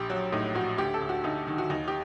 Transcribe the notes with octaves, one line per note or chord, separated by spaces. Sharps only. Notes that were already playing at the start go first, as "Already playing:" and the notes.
Already playing: A#1 G4
F#3
A2 D#4
A#1 F#4
D2 G4
A4
D2
F#4
D2 D#4
D#3
F#4
D#2 D#4
G4